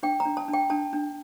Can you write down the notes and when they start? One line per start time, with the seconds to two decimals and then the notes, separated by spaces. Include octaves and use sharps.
0.03 D4 G5
0.20 A#5
0.25 D4
0.37 A5
0.48 D4
0.53 G5
0.70 D4 A5
0.93 D4